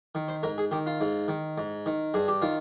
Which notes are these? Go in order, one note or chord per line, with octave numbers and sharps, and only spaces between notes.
D#3
C5
G#2 A#4
G#4
D#3 G4
F4
G#2
D#3
G#2
D#3
G2 G#4
G4
D#3 F4